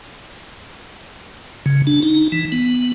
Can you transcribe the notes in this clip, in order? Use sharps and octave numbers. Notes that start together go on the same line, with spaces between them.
C#3
D4
D#4
E3
B3